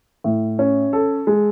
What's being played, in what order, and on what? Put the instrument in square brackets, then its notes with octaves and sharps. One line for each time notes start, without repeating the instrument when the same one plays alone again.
[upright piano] A2
C#4
A4
G#3